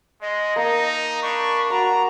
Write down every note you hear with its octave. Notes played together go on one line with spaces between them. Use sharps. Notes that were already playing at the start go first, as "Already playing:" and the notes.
G#3 D#5
A#3 D#4 A5 E6
D4 B5 C#6
F#4 A#5 C6